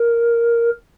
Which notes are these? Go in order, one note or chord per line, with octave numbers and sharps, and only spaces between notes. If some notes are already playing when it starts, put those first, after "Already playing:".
Already playing: A#4